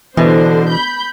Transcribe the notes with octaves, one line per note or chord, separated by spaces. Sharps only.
B2 D3 E3 C5
B5 G6